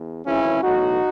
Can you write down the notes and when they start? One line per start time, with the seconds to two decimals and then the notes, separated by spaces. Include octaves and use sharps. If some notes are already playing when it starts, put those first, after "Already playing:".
Already playing: E2
0.25 G#1 F#2 C#3 E3 C#4 E4
0.63 B1 A2 E3 D#4 F#4